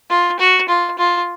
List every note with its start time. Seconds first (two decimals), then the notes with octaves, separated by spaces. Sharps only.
0.10 F4
0.39 F#4
0.69 F4
0.98 F4